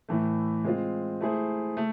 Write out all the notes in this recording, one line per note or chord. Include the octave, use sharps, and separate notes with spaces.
A2 E3 A3
G#3 C4 F4
A3 E4 G#4 C5
A3